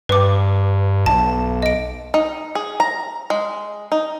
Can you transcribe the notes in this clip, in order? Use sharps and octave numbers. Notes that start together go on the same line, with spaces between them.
G2 B4 D6
B1 A5
D#5 D7
D#4
G#4
A#5
G#3
D#4